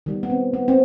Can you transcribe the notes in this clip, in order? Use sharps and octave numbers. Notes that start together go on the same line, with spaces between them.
D#3 G3 B3
B3
C4
B3
C4